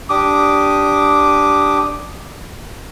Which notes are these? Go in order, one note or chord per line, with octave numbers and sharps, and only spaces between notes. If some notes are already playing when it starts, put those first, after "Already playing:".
D4 G4 D6 D#6